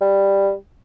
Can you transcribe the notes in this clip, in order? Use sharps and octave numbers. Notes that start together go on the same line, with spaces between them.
G3